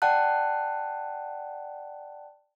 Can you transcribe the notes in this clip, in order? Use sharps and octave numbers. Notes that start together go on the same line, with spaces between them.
D5 F#5 G5 A5 F#6